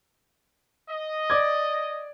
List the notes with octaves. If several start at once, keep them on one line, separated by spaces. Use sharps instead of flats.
D#5
D5 D6 G#6